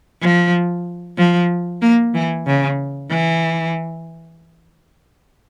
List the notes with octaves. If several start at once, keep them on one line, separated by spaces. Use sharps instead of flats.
F3
F3
A#3
E3
C#3
E3